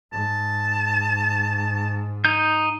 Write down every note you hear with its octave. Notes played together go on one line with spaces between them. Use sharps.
G#2 A5
D#4 G6